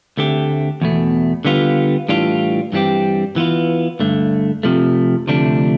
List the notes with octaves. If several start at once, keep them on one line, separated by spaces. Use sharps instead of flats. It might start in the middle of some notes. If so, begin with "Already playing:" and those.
D2 D3 A3 C4 G4
E2 B2 A3
D3 G3 B3 F4
A2 E3 G3 D4 F4
G2 E3 G3 C4 G4
E3 B3 F4
G2 D3 A3
F2 C3 F3 A3
D2 C3 F3 A3 D4